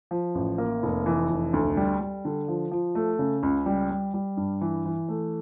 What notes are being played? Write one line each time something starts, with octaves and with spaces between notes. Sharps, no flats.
F3
A1
A#3
F1
E3
F1
D2
G3
G3
D3
F3
F3
A3
C#3
C#2
G3
G3
G3
G2
E3
E3
A3